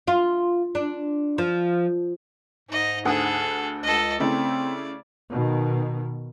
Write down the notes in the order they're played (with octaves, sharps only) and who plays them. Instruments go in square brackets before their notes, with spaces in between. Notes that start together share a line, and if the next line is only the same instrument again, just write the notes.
[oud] F4
D4
F3
[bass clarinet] G#2 [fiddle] D#4 D#5
[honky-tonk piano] D2 F#5 D#6 [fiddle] G#4 A4
[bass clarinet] C#2 [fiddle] A4 D#5
[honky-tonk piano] C#3 A3 E4 [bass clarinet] C4 [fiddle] D5
[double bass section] B2 D#3